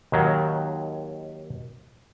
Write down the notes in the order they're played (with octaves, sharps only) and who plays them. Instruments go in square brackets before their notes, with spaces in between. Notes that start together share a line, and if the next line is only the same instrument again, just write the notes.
[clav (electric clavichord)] D#2 D#3 F#3